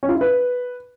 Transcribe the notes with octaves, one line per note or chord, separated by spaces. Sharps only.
C#4
F4
E4
B4